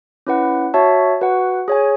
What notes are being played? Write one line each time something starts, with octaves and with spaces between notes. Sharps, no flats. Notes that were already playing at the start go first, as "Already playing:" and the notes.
C#4 E4 B4 F#5
F#4 C#5 E5 A5
F#4 B4 F#5
G#4 C#5 G#5